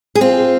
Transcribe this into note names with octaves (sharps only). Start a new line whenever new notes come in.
G#4
C4 F4